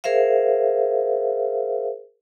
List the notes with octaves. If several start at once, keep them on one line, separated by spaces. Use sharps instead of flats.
G#4 A#4 C5 E5 F5